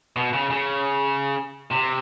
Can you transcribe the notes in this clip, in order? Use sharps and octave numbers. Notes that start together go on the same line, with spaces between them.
B2
C#3
C#3
C3